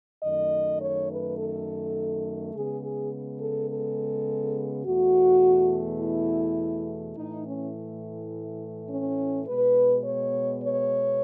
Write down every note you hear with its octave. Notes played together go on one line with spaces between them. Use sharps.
F#2 D#3 A3 D#5
C#5
B4
A4
C#3 G#3 B3 G#4
G#4
A4
A4
E2 B2 A3 F#4
E4
A2 E3 A3 D#4
C#4
C#4
B2 G#3 B3 B4
C#5
C#5